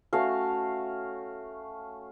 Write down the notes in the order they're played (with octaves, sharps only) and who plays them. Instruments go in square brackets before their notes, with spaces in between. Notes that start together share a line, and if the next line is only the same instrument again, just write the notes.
[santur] A3 C#4 F#4 F5